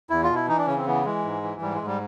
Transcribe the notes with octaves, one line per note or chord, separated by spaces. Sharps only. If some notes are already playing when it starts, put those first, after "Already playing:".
E2 E4
F4
B2
E4
E3 D#4
D4
C#3 C#4
C4
E3 B3
E3 G#3
G#2
E3
G#2 G3
G#3
G#2
G3